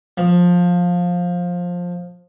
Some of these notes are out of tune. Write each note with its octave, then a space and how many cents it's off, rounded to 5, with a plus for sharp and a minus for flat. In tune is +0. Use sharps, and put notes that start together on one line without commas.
F3 +15